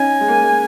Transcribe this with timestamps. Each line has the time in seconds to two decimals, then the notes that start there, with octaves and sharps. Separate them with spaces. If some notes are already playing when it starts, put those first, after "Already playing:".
Already playing: C#4 D#4 G#5
0.21 G#3
0.28 A#3
0.44 G#3